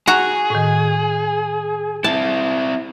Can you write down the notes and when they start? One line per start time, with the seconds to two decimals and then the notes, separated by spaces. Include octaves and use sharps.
0.07 F#4 G#4 F#5 A#5
0.50 A2 D#3
2.04 C4 E4 A5